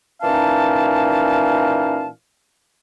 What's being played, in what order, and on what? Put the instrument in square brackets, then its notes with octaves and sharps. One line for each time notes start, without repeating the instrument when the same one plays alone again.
[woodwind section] A#2 E3 C#4 D#4 F5 A5